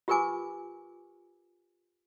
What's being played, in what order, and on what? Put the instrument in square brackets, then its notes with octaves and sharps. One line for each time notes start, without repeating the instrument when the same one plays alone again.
[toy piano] F4 G4 A#4 B4 G#5 D6